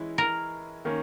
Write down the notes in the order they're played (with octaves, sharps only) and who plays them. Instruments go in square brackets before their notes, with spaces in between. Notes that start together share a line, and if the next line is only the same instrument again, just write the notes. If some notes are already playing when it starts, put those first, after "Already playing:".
Already playing: [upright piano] E3 G#3 C#4 E4
[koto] A#4
[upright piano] D#3 A#3 C#4